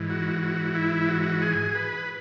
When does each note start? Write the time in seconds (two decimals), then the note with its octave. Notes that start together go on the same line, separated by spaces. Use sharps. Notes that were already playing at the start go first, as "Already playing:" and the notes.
Already playing: G#2 E3
0.10 F#4
0.42 F#4
0.75 E4
1.09 F#4
1.42 G#4
1.75 B4